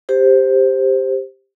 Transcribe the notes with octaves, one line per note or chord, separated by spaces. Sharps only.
G4 C5